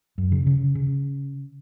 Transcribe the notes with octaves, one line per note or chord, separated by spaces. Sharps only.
F#2
C#3
C#3
C#3